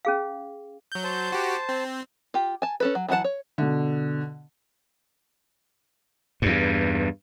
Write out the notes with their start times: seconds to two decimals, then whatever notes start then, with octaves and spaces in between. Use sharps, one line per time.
0.05 C#4 G#4 F5
0.92 F#3 G6
1.04 C5 A5
1.32 F#4 G4
1.69 C4
2.34 F4 G4
2.62 G#5 A5
2.80 C#4 A4 B4
2.95 F#3
3.08 E3 F#3 F4 F#5 A5
3.24 C#5
3.58 B2 D3
6.42 E2 G2